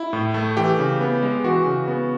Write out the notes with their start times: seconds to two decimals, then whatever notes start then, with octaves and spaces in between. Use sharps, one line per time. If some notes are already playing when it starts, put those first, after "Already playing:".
Already playing: E4
0.13 A2
0.34 A3
0.57 E3 G4
0.79 C#3
1.01 B3
1.22 G#3
1.44 E3 F#4
1.66 C#3
1.88 B3